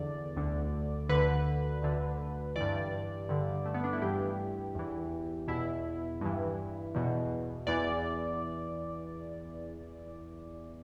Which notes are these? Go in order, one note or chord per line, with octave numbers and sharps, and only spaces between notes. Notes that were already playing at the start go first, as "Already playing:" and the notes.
Already playing: E2 D3 D5
D2 D3
D2 D3 B4
D2 D3
G2 E3 D5
G2 D3
A3
B3
D4
E4
G2 E3 G4
E2 E3
E2 B2 E4
G2 E3
E2 B2
E2 E3 D5